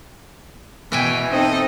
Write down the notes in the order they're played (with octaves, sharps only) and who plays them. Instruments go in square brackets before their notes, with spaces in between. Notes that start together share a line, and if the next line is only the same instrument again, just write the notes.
[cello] B2 [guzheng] E3 G5 G#5
[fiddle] C4 [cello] D#4 A4 [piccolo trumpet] D#5